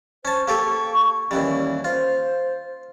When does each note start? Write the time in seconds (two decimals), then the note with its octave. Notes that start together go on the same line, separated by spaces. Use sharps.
0.25 C#4 C5 A5
0.48 A#3 G4 A4 C#6
1.31 D#2 E3 G3 C#4
1.84 F4 C5